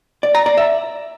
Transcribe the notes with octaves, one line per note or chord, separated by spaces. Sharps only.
D5
A#5
D5
E5